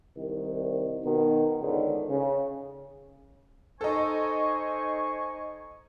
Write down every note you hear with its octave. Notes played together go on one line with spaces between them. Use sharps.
C2 D#3
B2 D#3
C#2 G#2 D3 D#3
C#3
D#4 A4 C5 G#5 C#6